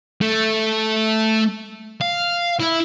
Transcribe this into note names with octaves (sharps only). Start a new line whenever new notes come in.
A3
F5
E4